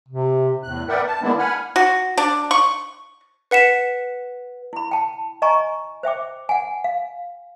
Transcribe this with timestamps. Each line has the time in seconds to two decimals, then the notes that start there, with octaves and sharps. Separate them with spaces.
0.08 C3
0.63 E2 A2 F#6
0.89 A#4 B4 D5 E5 F#5 G5
1.07 A5
1.23 D#3 G#3 A#3 B3 D4 E4
1.39 F#5 G#5 B5 F6
1.76 F#4
2.17 D4
2.51 C#6
3.51 B4 F#5 B6 E7
4.73 E4 B5
4.91 G5 A5
5.42 D#5 G#5 A#5 C#6
6.03 C5 E5 G5 D6
6.49 F#5 G#5
6.84 F5